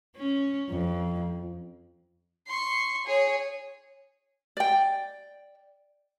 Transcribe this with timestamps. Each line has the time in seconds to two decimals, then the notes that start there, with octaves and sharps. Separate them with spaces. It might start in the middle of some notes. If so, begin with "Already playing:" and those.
0.16 C#4
0.70 F2
2.47 C6 C#6
3.06 G#4 C#5
4.57 D5 G5